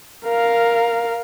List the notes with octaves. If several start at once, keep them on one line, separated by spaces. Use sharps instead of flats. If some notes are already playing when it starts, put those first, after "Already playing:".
A#4 F5